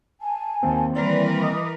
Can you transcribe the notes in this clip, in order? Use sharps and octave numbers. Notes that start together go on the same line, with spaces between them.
G#5 A5
D#2 D#3 A#3 C4
E3 G3 A#4 B4 D5 C6
D#5 D6 D#6